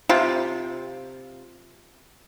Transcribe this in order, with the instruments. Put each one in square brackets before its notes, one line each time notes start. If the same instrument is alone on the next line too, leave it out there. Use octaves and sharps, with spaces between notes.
[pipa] C3 F4 G4